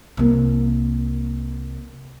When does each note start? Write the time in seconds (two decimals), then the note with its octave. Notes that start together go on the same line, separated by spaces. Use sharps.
0.17 C2 A#3